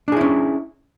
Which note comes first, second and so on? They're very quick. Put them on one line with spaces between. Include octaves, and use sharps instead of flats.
D4 G#4 E4 C#4